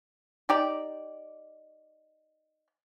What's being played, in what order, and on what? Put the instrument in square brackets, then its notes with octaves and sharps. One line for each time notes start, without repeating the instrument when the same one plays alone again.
[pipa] D#4 G4 D5